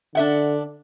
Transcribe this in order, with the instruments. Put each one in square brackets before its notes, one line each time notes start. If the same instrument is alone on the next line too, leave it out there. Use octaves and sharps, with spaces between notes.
[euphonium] D3 [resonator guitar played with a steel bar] D4 E5 F#5